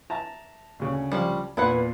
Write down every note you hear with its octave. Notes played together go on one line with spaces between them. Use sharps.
E5 A5 A#5
D2 C#3
F3 G3
E2 A#2 E4 B4 F#5